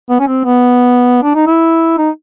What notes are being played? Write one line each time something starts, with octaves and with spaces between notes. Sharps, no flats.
B3
C#4
C4
B3
D4
D#4
E4
D#4